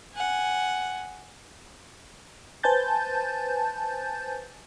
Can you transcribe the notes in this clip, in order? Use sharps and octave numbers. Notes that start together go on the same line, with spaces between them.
F#5 G#5
B4 C5 G#5 A5 G6 A6